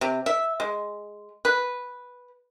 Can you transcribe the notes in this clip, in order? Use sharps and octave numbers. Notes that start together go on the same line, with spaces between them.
C3
E5
G#3
B4